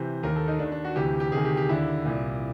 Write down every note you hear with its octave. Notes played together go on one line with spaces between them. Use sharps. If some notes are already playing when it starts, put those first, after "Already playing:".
Already playing: C3 E3 C5
D#2 D#3 A#4
A4
D#4
D#2 D#3 D4
D4
F#4
D2 C3 E3 G4
G4
D2 C3 D#3 G#4
G4
G4
D#2 D3 E4
C2 A#2